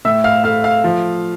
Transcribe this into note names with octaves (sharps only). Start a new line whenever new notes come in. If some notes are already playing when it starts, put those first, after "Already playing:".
A2 E5 E6
F5 F6
A3 F5 F6
F5 F6
F3